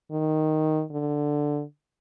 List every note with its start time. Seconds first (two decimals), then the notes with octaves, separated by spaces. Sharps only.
0.11 D#3
0.91 D3